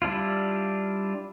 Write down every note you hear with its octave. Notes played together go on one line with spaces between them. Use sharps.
G3 D4 E4 F4